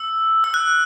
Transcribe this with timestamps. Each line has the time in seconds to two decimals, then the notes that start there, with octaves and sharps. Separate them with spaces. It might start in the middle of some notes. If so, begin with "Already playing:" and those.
Already playing: E6
0.44 E6
0.54 F#6